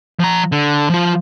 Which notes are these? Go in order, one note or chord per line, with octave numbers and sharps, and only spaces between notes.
F3 A#5
D3
F3 F4